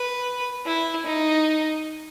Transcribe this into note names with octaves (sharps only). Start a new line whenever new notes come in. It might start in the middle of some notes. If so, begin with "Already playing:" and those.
Already playing: B4
E4
D#4